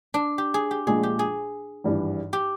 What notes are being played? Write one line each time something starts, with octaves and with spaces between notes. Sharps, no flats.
D4
G4
G#4
G4
A#1 A#2 F3 G#3 G#4
G4
G#4
G#1 G2 E3
G4